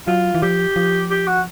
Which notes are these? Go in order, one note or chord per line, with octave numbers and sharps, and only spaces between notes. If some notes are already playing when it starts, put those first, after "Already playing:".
F#3 F4
E3
F3 G4
F3
G4
F#4